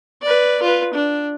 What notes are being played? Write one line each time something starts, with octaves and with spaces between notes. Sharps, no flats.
B4 D5
F4 B4
D4